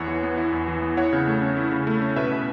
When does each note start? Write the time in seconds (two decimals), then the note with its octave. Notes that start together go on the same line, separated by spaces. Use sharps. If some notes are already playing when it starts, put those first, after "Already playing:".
Already playing: E2 E4 C#5 F#5
0.08 E3
0.23 B3
0.38 E4
0.52 E2
0.68 E3
0.82 B3
0.97 E4 C#5 F#5
1.13 C#3
1.27 A3
1.42 C#4
1.57 E4
1.72 C#3
1.87 A3
2.02 C#4
2.16 B2 B4 E5
2.31 B2